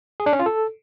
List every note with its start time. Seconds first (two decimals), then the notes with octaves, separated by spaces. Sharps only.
0.20 G#4
0.26 D4
0.33 C#4
0.39 F4
0.46 A4